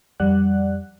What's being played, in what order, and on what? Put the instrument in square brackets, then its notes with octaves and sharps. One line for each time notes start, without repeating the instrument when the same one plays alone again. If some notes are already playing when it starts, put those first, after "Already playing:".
[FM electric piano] F2 G3 D5 F#5 F#6